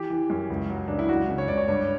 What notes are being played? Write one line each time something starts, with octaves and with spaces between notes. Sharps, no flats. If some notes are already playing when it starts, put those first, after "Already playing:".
Already playing: E3 G4
E3
F#2
C#2
F#3
C#2 D4
E4
C#2 F#4
C#3
C#5
C#2 D5
C#5
G2 C#5